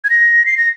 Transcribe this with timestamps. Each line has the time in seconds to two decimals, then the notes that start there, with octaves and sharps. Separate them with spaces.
0.04 G#6
0.10 A#6
0.46 C7
0.57 A#6